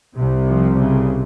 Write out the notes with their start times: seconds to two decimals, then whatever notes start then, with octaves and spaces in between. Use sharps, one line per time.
0.14 C2 C3
0.46 F3
0.77 C#3